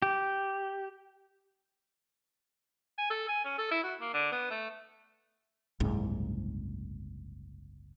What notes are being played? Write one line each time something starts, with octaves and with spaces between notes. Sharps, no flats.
G4
G#5
A4
G#5
C#4
A4
E4
F#4
A#3
D3
B3
A3
F#1 C2 G#2